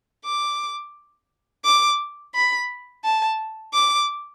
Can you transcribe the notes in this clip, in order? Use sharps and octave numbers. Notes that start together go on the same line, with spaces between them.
D6
D6
B5
A5
D6